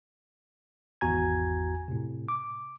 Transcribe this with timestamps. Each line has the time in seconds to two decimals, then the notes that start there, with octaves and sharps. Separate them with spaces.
1.01 G#1 E2 F#4 G#5 A#5 G#6
1.88 A2 C3
2.29 D6